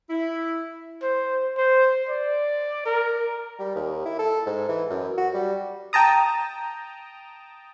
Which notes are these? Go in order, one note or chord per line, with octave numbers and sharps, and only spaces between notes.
E4
C5
C5
D5
A#4
G3
D#2
E4
A4
G#2
E3
F#2
F#4
G3
G5 A5 A#5 D#6